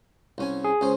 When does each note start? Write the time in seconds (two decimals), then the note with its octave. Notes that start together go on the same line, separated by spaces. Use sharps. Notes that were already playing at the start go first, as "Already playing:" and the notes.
0.38 C2 C#4 G#5
0.64 G#4
0.81 C#2 C#4 C5